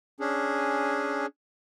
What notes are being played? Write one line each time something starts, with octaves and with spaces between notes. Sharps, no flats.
C#4 D4 G#4